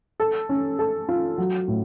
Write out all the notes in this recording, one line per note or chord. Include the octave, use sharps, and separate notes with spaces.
A4
C#4
A4
F4
F#3
A2